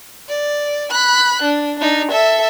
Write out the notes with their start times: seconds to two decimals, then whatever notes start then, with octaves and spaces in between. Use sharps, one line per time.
0.29 D5
0.90 B5 F#6
1.42 D4
1.79 D4 D#4
2.11 A4 E5